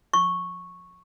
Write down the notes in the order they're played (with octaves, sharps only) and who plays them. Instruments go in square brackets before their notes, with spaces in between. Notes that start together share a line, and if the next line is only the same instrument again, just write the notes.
[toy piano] C#6